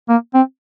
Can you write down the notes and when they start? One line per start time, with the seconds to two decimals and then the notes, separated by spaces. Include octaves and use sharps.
0.09 A#3
0.34 C4